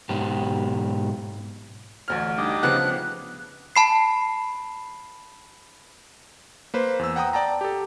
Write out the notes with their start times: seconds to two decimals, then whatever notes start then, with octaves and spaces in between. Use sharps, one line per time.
0.09 G#2 B2 G4
2.08 A1 D2 F6
2.38 G3 D4 D#4
2.63 C#3 F3 B3 F#6
3.76 A5 B5 C7
6.74 A#3 B4 C5
6.99 E2 E6
7.16 F#5 G5 A#5 D#6
7.33 D5 G5 A5 A#5
7.61 G4 A4